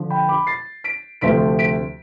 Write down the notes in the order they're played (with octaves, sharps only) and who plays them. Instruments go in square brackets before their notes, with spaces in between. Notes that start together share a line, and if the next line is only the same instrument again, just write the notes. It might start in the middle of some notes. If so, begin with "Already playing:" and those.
Already playing: [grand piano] D3 F3
G5 B5
B5 D6
A6 C7
B6 D7
D2 C3 F3 A3 C4 B6 D7
B6 D7